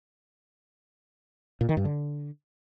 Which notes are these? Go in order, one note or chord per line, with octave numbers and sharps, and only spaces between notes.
A#2
D#3
G2
D3